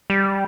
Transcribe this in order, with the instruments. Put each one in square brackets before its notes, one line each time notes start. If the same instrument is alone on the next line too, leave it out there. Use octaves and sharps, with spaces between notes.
[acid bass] G3